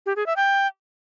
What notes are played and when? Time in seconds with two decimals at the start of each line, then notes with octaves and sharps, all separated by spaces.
0.06 G4
0.16 G#4
0.26 E5
0.36 G5